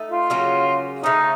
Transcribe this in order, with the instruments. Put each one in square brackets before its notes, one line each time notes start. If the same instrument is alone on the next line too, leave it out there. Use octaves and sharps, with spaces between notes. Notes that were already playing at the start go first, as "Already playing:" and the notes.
Already playing: [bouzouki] A3 D#4 A4
[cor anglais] F4
[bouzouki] C#3 F#3 A#3 C#4
[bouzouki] C#3 A3 C#4 [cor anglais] D#4